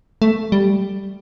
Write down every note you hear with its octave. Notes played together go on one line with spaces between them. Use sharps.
A3
G3